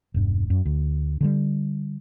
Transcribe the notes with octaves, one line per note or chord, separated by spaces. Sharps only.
E1 G2
F#2
D2
D3 F#3 G3